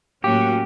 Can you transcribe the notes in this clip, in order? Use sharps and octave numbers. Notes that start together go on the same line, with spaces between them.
A2 F#3 A#3 C#4 F#4 G4